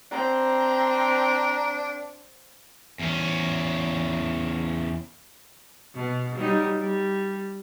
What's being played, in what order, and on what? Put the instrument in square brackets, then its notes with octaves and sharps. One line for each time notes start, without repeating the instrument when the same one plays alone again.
[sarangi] C4 [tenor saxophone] D4 [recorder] A#5
[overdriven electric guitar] E2 C#4
[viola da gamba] B2
F#3 G3 D#4
G3